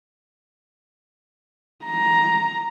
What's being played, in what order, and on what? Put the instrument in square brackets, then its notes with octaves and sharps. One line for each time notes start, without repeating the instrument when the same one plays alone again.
[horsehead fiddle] A#5